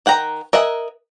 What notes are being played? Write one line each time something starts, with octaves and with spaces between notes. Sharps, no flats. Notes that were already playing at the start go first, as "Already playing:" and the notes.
D#3 F#5 G5 A#5
A#4 D#5 E5 F#5 G#5